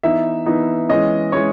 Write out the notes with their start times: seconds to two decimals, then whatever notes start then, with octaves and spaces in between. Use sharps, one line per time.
0.03 E3 B3 D#4 E5
0.46 E3 B3 D#4
0.89 E3 G#3 C#4 D#5
1.32 E3 G#3 C#4 C#5